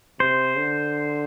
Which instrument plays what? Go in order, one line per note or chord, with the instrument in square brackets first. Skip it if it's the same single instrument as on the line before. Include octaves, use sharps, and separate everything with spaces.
[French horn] C3 [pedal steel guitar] C5
[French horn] D3